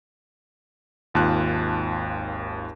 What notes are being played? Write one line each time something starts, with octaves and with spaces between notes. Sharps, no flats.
G#1 D#2 F4 A5 F#6